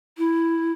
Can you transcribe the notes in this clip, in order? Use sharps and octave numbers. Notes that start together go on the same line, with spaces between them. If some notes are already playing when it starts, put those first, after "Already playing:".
E4